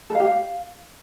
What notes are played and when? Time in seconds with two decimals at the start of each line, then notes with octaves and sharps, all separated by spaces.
0.10 A4
0.15 F5
0.20 G4
0.25 F5